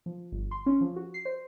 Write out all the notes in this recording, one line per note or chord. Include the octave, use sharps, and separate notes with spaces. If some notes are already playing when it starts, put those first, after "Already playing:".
F3
G1
C6
C#4
F3
F#4
C7
C5